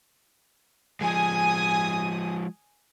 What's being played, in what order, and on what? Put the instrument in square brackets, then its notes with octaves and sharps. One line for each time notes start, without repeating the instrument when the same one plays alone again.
[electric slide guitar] F3 G#3 [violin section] G#5 D#6